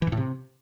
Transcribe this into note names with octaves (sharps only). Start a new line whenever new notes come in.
E3
G#2
A2
C3